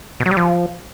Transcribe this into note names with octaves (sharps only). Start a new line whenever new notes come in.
B2
F#3
G3
F3